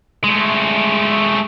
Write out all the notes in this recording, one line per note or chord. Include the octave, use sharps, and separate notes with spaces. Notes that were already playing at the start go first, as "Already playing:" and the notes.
G#3 A3